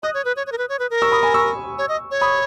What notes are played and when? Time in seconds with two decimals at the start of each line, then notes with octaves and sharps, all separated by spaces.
0.03 D#5 D#6 F#6
0.14 C#5
0.25 B4
0.36 C#5
0.47 C#5
0.52 A#4
0.58 B4
0.69 C#5
0.79 B4
0.90 A#4
1.02 C#6 E6
1.12 B5 D#6
1.23 G#5 B5
1.34 C#6 E6
1.78 C#5
1.89 D#5
2.11 C#5
2.21 B5 D#6